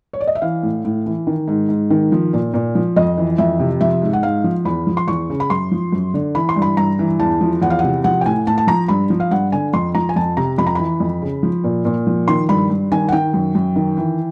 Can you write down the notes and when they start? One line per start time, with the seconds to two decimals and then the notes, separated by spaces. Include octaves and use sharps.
0.13 C#5
0.21 D5
0.27 D#5
0.35 E5
0.42 E3 F5
0.63 A2
0.85 A2
1.06 E3
1.27 D#3
1.48 G#2
1.69 G#2
1.90 D#3
2.12 F3
2.33 A#2
2.54 A#2
2.75 F3
2.96 F2 D#5
3.18 E3
3.38 F2 E5
3.60 C3
3.81 F3 E5
4.02 G#2
4.13 F#5
4.23 G#2 F5
4.44 F3
4.65 E2 B5
4.87 F3
4.97 C6
5.08 E2 C#6
5.30 C#3
5.40 B5
5.50 F#2 C6
5.71 F3
5.92 F#2
6.14 D3
6.35 E3 B5
6.49 C6
6.56 G2
6.62 B5
6.77 G2 A#5
6.99 E3
7.19 E2 A5
7.41 F3
7.62 E2 F#5
7.70 F5
7.79 C3 F#5
8.04 F3 F#5
8.21 G5
8.26 A2 G#5
8.47 A2 A5
8.58 A5
8.67 F3 A#5
8.88 G2 B5
9.10 F3
9.20 F5
9.31 G2 F#5
9.52 D3 G#5
9.73 F2 C6
9.95 F3 A#5
10.09 G#5
10.16 F2 A5
10.37 C3 A#5
10.58 F2 B5
10.67 A#5
10.75 E3 B5
11.00 F2
11.22 C#3
11.43 F3
11.64 A#2
11.85 A#2
12.07 F3
12.28 D#3 C6
12.49 G2 B5
12.70 G2
12.92 D#3 G#5
13.09 F#5
13.12 D#3 G5
13.34 F#2
13.55 F#2
13.76 D#3
13.97 E3